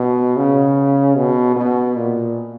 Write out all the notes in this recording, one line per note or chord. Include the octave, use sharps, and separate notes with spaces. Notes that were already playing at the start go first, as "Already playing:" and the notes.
Already playing: B2
C#3
B2
B2
A#2